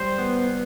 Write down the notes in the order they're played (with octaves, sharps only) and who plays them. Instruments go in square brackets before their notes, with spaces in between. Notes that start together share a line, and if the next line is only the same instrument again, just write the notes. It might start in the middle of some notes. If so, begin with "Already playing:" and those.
Already playing: [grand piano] G3 [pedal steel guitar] C5
[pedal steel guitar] B3